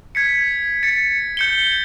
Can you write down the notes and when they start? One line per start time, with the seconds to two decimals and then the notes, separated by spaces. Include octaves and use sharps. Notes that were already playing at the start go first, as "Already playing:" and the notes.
0.15 G#6 B6 C#7
0.83 A6 C#7
1.37 G6 C#7 G7